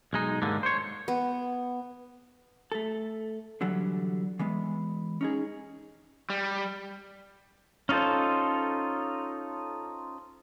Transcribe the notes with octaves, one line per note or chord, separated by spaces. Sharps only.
B1 G#3 D#4
D#2 G#2 D3 A#3
C5 C#5
B3
A3 A4
D3 E3 F#3 G3
E3 G#3 B3
C#4 D#4 G#4
G3
C#4 D#4 F4 A4 C5